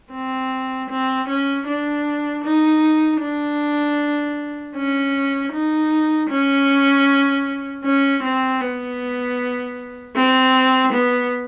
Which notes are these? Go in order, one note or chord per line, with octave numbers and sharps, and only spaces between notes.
C4
C4
C#4
D4
D#4
D4
C#4
D#4
C#4
C#4
C4
B3
C4
B3